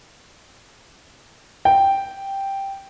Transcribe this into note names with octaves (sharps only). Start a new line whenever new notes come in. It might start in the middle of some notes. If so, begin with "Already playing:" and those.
G5